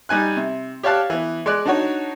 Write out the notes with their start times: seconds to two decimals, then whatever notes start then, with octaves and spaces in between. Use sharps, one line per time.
0.09 G3 D#4 G#5 F#6
0.37 C3
0.83 G4 C#5 D5 F5 A5 F#6
1.10 E3 B3
1.46 G#3 D5 F#6
1.66 D4 D#4 F#4 C#5